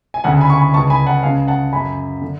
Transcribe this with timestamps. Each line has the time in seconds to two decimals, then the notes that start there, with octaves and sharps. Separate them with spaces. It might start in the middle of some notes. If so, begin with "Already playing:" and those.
0.14 G#5
0.24 D2 C#3 F#5 A5
0.41 G#5 B5
0.50 C#6
0.57 G#5 B5
0.74 C#2 C#3 A5 C#6
0.90 G#5 B5
1.07 F#5 A5
1.23 C#2 C#3 F5 G#5
1.48 F#5 A5
1.72 F#2 C#3 G#5 B5
2.22 D3